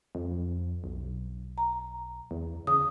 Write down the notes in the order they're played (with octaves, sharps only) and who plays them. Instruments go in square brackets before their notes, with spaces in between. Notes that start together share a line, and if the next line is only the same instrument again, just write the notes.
[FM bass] F2
B1
[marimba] A#5
[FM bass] E2
[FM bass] C#3 [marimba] D#6